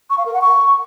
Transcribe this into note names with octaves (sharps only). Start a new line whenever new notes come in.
C#6
F5
A#4
F#5
C#6